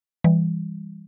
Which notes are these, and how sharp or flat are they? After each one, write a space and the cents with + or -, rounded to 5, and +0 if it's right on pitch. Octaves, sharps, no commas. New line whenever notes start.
E3 +10 G3 +30